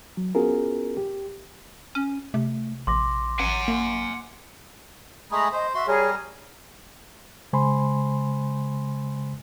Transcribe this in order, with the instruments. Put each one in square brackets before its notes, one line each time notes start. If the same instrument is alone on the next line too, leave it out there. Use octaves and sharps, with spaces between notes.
[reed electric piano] F#3
B3 C#4 F4 F#4 G#4 A#4
G4
[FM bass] C#4
[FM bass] C3 [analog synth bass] A3
[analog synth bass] A#1 [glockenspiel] C6 D6 A#6
[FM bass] A1 [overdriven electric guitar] F#5 G#5
[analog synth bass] A#3
[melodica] G#3 A3 G#4 [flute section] A#5 B5
[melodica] C5 [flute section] D#5
[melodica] F#4 C6 [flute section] E5
[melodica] G3 A#4 [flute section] G#4 C#5
[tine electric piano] C#3 G#3 C5 G#5 B5 C6